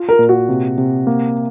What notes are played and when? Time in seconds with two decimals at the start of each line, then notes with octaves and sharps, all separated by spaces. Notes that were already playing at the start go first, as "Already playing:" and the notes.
Already playing: F4
0.09 A#4
0.19 A#2
0.29 F#4
0.49 C3
0.78 C3
1.07 A#3